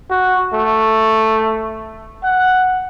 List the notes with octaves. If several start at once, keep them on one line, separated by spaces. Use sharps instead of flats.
F#4
A3
F#5